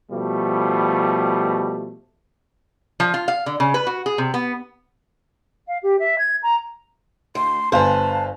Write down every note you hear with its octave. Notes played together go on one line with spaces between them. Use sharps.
B2 F3 G3 A3
F3
F4
F5
D3
C#3
B4
F#4
G#4
C3
B3
F5
G4
E5
G#6
A#5
D2 C6
G1 B4 C5 F5 G#5 A5